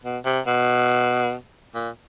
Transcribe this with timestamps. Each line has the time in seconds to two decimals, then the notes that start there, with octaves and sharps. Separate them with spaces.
0.04 B2
0.25 C3
0.46 B2
1.75 A#2